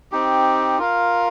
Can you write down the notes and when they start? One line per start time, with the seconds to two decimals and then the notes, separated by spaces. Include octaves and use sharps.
0.12 C4 D#4 G4
0.78 F4 A#4 F5